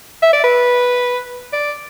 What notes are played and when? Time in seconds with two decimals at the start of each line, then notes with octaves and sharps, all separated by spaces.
0.23 E5
0.33 D5
0.44 B4
1.53 D5